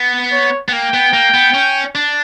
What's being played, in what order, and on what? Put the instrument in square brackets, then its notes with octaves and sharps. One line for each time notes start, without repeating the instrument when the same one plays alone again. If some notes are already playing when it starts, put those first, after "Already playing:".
Already playing: [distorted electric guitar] B3
[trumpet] C#5
[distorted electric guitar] B3
[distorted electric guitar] A#3 [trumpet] G5
[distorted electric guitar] B3
A#3
B3
C#4
D4